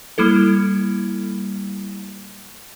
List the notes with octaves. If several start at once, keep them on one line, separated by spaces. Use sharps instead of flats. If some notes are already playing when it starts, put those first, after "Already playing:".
G3 A#3 E4 A4